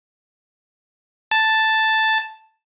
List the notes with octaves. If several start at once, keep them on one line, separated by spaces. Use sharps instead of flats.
A5